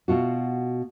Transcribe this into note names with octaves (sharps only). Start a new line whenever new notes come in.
B2 F4 F#4